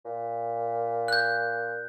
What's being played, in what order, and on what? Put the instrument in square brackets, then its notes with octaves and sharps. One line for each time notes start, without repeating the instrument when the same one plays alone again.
[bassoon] A#2
[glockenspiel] F#6 G6